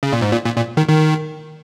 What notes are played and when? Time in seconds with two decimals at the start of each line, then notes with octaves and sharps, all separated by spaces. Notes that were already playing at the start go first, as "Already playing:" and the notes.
0.03 C#3
0.13 A#2
0.22 G#2
0.32 A#2
0.45 A#2
0.56 A#2
0.77 D#3
0.88 D#3